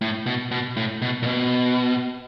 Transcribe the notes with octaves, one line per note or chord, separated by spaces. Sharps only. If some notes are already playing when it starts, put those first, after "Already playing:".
A2
B2
B2
A2
B2
A#2
B2